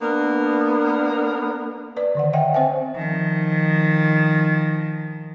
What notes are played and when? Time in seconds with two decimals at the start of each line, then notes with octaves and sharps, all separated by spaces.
0.02 A#3 B3 D4 A#4
1.97 B4 D5
2.15 D3 D#3 F#5
2.33 C#5 D#5 E5 F#5 G5
2.54 C4 C5 C#5 E5 G5 G#5
2.96 D#3 F3